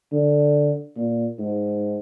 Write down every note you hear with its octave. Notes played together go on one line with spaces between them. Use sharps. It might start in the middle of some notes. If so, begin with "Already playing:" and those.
D3
A#2
G#2